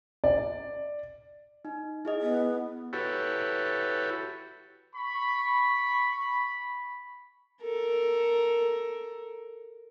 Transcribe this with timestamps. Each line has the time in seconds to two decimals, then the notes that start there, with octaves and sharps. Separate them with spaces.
0.24 D5
1.65 D#4
2.05 E4 G#4 D#5
2.21 B3
2.93 E4 F#4 G4 A4 B4 C#5
4.94 B5 C#6
7.63 A4 A#4